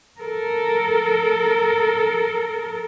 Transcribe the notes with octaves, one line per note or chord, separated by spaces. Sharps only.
A4 A#4